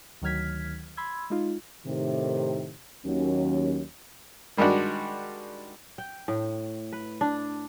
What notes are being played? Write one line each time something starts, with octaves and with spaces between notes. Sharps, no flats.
D2 D#3 F#3 F6 G#6 B6
B5 C6 E6 G#6
G#3 D#4 F4
A2 C3 D#3
D#2 F#3 C#4
D#3 G3 G#3 D4 F#4
G5
A2
B4
D4